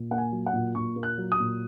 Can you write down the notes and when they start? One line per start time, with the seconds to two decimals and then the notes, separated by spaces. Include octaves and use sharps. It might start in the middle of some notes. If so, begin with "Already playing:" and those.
Already playing: A#2
0.11 A#3 F#5
0.18 G#5
0.32 F#3
0.46 F#5
0.53 A#2
0.75 A#2 C#6
0.96 A#3
1.03 F#6
1.18 F#3
1.32 D#6
1.40 A#2